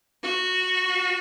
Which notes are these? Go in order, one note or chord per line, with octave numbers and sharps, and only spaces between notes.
F#4